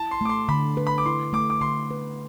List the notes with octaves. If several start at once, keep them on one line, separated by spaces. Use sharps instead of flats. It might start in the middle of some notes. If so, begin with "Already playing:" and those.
Already playing: E4 A5
C6
A3 D6
C6
D3 B5
B4
B5
D6
E4 C6
A3 D6
D6
D3 C6
B4